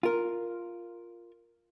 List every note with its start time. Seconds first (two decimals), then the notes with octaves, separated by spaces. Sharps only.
0.03 F4 A#4